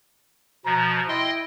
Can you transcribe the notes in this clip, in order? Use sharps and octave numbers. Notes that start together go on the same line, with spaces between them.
B2 F3 A#5
E4 D#5 G5 C6